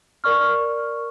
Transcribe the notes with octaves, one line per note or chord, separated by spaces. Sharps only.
A#4 D5 C#6 F6